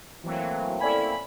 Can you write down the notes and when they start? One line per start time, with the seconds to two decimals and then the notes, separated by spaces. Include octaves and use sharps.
0.24 E3 F#3 A3 A#3 C4
0.81 C#4 E4 A4 D5 G#5 B5